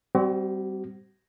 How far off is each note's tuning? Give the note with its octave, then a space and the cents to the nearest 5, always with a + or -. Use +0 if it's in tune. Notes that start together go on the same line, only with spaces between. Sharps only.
G3 -5 C4 -5 F#4 +35